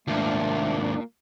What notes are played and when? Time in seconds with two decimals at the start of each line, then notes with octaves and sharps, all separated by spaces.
0.08 D#2 G#2 A3 A#3 D4 F4